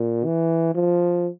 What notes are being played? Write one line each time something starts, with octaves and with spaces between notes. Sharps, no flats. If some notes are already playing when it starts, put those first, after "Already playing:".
Already playing: A#2
E3
F3